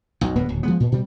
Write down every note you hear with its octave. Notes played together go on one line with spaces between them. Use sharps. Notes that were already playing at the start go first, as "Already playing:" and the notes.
B1 F#2
D#1 G2 B3
D1
F3 G#3 B3
A#2
B2 G3